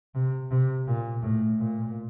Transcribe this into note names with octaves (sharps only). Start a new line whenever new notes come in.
C3
C3
A#2
A2
A#2